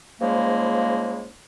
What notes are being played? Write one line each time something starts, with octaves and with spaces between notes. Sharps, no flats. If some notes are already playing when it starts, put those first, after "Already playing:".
G#2 C#3 F3 G3 G#3 A#3